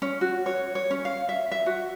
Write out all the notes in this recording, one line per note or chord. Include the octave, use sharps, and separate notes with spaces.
C#4
F#4
C#5
C#5
C#4
F5
E5
E5
F#4